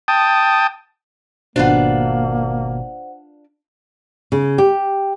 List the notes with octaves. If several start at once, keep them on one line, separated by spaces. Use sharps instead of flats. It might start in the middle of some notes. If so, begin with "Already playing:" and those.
G5 A5 D#6
G#1 B2 A#3 D4 F4 B4 C5 F#5
C#3
G4